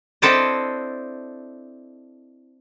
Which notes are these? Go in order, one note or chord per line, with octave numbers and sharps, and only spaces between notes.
C4 D4 E4 A4 C5 D#5